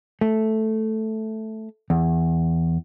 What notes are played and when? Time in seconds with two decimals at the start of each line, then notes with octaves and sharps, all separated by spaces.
0.21 A3
1.90 E2